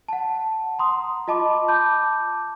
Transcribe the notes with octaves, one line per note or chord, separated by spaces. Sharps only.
F#5 A5
A#5 C6 D#6
F4 D#5 A5 B5 D6
A5 B5 D6 G6